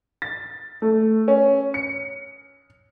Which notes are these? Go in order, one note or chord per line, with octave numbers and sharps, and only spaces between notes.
A6
A3
C#4
C#7